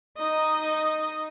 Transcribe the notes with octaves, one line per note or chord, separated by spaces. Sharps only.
D#4 D#5